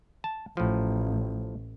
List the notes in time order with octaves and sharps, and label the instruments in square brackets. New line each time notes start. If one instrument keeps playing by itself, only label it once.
[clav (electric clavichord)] A5
[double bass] A1 [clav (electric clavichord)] A2 F3